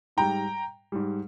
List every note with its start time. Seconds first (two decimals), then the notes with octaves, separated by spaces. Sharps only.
0.17 G#2 G3 G5 A#5
0.92 G#2 G3